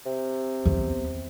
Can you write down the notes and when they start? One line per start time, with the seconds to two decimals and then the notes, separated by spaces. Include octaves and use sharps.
0.06 C3
0.66 E2 B3